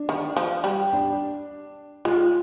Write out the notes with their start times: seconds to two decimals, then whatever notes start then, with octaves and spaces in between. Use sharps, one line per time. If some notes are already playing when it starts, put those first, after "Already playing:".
Already playing: D4
0.09 D#3
0.37 F3
0.64 G3
0.93 D4
2.05 G#3 F4